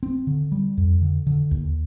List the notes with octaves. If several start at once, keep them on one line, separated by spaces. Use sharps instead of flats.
C4
D3
G3
F2
D3
D3
D#2